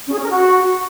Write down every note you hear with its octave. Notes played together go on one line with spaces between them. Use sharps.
C#4
G#4
C#4
A#4
F#4